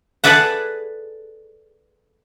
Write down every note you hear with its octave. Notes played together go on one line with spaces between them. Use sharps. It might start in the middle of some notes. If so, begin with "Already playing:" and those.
G#4 A4 B4 D5 E5 F#5